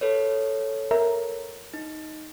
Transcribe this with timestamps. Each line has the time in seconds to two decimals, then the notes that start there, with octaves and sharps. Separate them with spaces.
0.01 A4 B4 C#5
0.91 A#4 E5 A#5
1.74 D#4